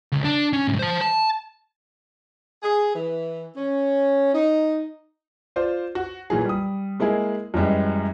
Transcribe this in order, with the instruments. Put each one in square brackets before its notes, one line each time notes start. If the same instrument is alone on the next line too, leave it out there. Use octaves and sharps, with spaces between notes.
[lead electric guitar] C#2
D4
C#4
C2 G#2
C5 A5
A5
[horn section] G#4
E3
C#4
D#4
[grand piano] F4 C5 D5
F#4
A#2 E3 F#3 G#4
G3 D#6
G#3 A#3 E4 G#4
F#2 E3 G3 G#3